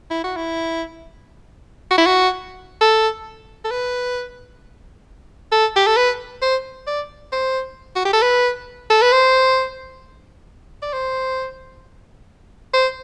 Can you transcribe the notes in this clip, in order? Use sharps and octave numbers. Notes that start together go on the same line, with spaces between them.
E4
F#4
E4
F#4
E4
F#4
A4
A4
B4
A4
G4
A4
B4
C5
D5
C5
F#4
G4
A4
B4
A4
B4
C5
D5
C5
C5